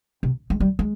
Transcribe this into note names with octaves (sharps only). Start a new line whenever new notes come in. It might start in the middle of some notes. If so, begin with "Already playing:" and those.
C3
G#3
G3
G#3